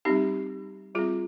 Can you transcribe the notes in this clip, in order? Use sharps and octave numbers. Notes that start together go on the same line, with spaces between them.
G3 C4 D#4 G4
G3 C4 F4 G#4